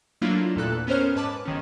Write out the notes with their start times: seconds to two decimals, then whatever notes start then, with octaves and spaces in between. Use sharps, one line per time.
0.22 F#3 A3 A#3 D4 E4 F4
0.56 E2 A#2 A4 F#6
0.87 B3 C#4 A#4 C5 C#5 F6
1.16 G#2 B4 A5 D6
1.45 G1 D#3 C#4